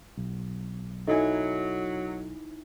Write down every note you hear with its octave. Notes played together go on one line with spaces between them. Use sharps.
B1
F#3 D#4 E4 A4 D#5 G#5